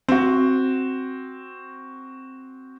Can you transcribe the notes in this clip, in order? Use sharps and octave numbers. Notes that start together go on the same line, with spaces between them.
C4 F#4